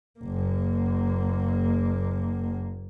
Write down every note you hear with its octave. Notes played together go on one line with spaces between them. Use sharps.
F#1 A#3